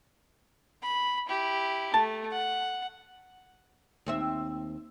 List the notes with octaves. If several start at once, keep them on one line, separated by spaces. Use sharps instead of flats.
B5
E4 G4
A3 A5
F#5
D#2 C4 E5